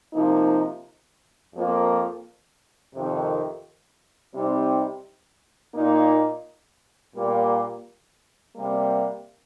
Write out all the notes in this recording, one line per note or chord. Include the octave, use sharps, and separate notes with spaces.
C3 F3 A#3 D#4
F2 F3 A#3
F2 C3 D#3
C3 G3 C4 D#4
A#2 A#3 D#4
A#2 G3 A#3
C3 G3 A#3